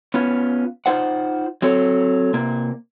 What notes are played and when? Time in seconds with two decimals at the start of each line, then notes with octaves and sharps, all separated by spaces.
0.14 B3 C#4 F4
0.86 D#4 F4 C5 F#5
1.62 F#3 C4 A4 C#5
2.33 C3 A#3